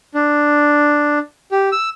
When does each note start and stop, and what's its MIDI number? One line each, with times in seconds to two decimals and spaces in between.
0.14 1.18 62
1.51 1.69 67
1.72 1.89 88